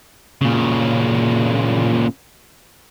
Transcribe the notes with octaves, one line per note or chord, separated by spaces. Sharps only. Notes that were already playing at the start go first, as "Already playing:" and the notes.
A#2 C#3